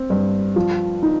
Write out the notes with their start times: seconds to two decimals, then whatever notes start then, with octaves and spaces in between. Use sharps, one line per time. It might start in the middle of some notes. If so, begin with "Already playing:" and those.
Already playing: C4
0.10 G2
0.56 F3
1.03 D#4